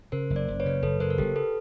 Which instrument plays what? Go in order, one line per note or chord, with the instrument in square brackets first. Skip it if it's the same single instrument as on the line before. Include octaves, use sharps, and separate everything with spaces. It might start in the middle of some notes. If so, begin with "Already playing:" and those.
[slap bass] C#3 [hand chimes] A#4 C5
[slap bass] F#1
[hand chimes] C5 D5
[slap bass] F#1
[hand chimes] B4 C#5
[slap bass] C#3
[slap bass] F#1 [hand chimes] A4 B4
[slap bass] C#3 [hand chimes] A#4 C5
[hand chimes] A#4
[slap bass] F#1 [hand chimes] G4 A4
[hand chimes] A4 B4